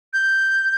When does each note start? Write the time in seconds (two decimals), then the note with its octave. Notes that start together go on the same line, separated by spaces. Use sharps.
0.14 G6